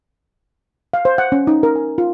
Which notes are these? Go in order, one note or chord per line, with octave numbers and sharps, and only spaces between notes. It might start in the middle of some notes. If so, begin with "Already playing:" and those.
F5
C5
F#5
C#4
D#4
A#4
G#5
F4